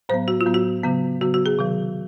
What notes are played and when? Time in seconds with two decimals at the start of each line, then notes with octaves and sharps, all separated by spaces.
0.09 A2 F#3 B3 C5
0.28 F#4
0.41 F4
0.46 A2 F#3 B3
0.54 F#4
0.84 C#3 F#3 B3
1.21 C#3 F#3 B3 F#4
1.34 F#4
1.46 G#4
1.59 C3 D#3 F#3